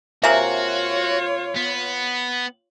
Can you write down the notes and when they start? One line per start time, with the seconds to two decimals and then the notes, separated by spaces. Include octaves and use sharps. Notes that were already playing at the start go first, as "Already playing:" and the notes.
0.23 C3 A#3 F4 F#4 C#5 E5 F#5 G#5
1.56 B3